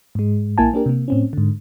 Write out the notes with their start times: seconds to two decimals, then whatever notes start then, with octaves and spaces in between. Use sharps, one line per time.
0.15 G#2 G#3
0.58 A#1 A#3 E4 G#5 A5
0.74 A#3 D4 G4 A#4
0.86 C3 A#3
1.08 A2 C4 C#4
1.33 G#2 D3